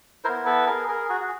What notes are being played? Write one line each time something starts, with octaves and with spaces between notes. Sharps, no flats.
B3 E4 A#4 C5
A4 B4
G#4 A#4
G#4 A#4
F#4 G#4
F#4